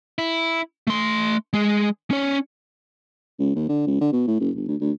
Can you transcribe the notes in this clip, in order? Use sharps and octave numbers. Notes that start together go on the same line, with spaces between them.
E4
A3 C6
G#3 G#4
C#4 C#5
C#2
D#2
D3
C#2
D3
B2
A2
F#1
G1
D2
D2